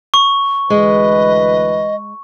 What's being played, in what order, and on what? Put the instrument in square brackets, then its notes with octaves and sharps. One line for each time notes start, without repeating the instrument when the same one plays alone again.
[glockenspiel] C#6
[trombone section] D2 E3 B4 [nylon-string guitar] G#3 [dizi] D#5